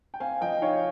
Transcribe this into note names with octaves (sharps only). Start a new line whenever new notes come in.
G5
C4 F5 G#5
F3 D#5 G5
D#4 C#5 F5